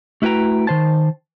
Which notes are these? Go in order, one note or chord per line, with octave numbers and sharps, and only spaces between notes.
A3 E4 F#4 B4 G5 A#5
D#3 C5 A5